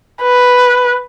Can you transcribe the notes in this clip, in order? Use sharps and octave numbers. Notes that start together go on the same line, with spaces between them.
B4